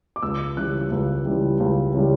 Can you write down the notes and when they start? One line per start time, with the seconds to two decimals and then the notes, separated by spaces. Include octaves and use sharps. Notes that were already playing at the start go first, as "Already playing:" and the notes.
0.16 D6
0.23 C#2 E6
0.57 C#3 E3 G3 F#6
0.91 C#2
1.26 C#3 E3 G3
1.60 C#2
1.94 C#3 E3 G3